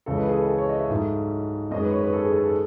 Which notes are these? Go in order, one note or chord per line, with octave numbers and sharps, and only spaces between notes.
C#2 C#3 E3 G#3 A4
B4
G#4
A4
A4
C#5
D#5
E5
G#2 F#3 A3
F#2 D#3 G#3 D#5
B4
C#5
B4
A4
G#4
A4
A4